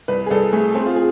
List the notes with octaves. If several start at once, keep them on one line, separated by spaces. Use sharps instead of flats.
C2 B4
G#4
C2 A4
A3 G#4
C4 G#4
F4
G#4